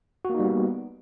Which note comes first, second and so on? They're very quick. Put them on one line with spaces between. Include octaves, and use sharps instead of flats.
F#4 A#3 D#4 G3 B3